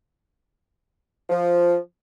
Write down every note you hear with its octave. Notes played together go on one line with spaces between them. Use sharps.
F3